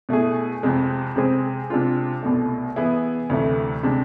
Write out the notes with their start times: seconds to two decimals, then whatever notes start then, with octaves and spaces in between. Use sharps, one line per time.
0.09 B2 A3 E4 G#4
0.63 F2 C3 G#3
1.16 C3 G#3 C4 G#4
1.70 C3 G#3 D4 F4
2.23 C2 B2 A3
2.76 E3 B3 E4 G#4
3.30 D2 C3 E3 A3 E4
3.83 C3 G#3 D4